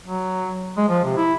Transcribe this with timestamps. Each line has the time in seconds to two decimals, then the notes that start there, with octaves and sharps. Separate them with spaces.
0.05 F#3
0.77 G#3
0.89 F3
1.05 C3
1.17 E4